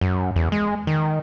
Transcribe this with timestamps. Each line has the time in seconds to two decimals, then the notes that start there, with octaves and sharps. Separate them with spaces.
0.01 F#2
0.36 E2
0.52 G#3
0.87 D#3